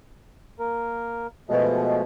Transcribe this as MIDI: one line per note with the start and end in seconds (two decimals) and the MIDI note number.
0.60 1.27 58
0.60 1.27 70
1.49 2.04 47
1.49 2.02 53
1.49 2.02 56
1.49 2.02 57